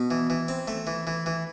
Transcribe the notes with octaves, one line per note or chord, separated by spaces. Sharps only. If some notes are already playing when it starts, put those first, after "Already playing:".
Already playing: B2
E3
E3
C4
A3
E3
E3
E3